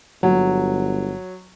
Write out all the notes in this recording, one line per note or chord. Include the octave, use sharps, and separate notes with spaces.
G1 F#3